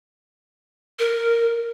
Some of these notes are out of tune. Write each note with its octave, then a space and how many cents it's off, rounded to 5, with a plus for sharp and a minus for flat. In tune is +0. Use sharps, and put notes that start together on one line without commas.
A#4 -5